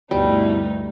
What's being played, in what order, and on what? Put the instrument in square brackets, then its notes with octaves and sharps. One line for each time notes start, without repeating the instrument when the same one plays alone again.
[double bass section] D2 G2 [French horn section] B2 E4 [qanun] G3 [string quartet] A3 D#4